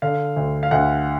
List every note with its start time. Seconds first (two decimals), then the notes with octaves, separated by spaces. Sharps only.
0.02 D3 F5
0.36 D2
0.63 F5
0.71 D2 F#5